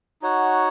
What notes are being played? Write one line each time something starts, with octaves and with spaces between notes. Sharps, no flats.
D#4 F#4 C#5 F#5